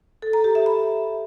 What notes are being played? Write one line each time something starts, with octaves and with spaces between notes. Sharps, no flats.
A4
A#5
G4
E5
B5